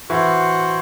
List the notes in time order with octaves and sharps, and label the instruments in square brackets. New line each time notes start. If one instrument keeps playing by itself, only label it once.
[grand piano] E3 [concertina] F#4 C5 F#5